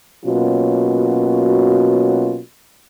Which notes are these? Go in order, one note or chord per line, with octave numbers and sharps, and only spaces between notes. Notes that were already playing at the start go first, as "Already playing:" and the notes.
B2 F#3 A#3 C#4 F4 F#4